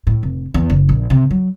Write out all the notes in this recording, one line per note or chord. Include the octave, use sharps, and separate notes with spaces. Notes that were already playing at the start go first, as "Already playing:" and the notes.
A2
F1
E2
F#1
A#1
C3
F#3